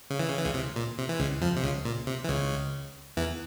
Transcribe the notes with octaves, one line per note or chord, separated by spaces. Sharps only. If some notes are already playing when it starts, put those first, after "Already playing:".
C#3
E3
C#3
E3
C#2 C#3
C3
A#2
C3
E3
C#2 C#3
F2 F3
C3
C#2 C#3
A#2
C3
E3
C#2 C#3
E2 E3